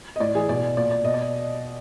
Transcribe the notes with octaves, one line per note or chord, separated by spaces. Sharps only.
D#5
A2 D5
E3 G#4
B2 D5
A#2 D5
D5
B2 D#5
D5